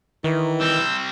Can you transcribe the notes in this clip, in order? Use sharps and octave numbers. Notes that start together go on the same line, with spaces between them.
D#3 E3
G3 C4 E6 G6